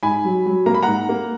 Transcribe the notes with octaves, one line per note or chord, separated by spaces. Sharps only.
G#2 G#5 B5
F#3
F#3
A#3 A#5
B5
G#2 F#5 A#5
A#3